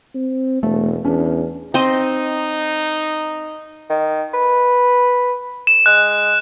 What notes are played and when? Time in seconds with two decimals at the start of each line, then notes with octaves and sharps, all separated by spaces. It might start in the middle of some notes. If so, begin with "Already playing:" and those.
0.15 C4
0.63 E1 A3
1.05 E2 C#4 D4
1.74 C4 D#4 C5 D#5
3.90 D#3
4.34 B4
5.67 E7
5.86 G#3 F#6